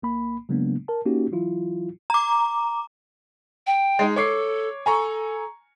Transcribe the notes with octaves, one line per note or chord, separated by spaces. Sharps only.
B1 A#3 B5
C#3 F#3 G#3 A#3 B3 D4
A#4 A5
A#3 C#4 D#4 F#4 G4
E3 F#3 E4 F4
A#5 D6
G5
G#3 D#4
A4 C#5 D6 C7
A4 G#5 A#5 C#6